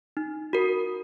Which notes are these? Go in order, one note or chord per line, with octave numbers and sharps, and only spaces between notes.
D#4
F#4 A#4